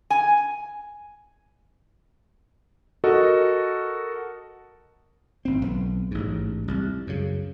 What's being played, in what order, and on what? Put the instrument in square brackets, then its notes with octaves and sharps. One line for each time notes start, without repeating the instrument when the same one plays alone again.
[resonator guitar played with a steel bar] G#5
[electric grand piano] F#4 A4 A#4 D#5
[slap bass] G#1 C4
B1 B3
A1 G#2
C2
F#2 C#3